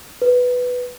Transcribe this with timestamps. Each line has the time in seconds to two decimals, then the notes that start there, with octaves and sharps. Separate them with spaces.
0.22 B4